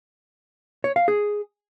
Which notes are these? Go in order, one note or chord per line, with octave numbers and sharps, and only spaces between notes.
C#5
F5
G#4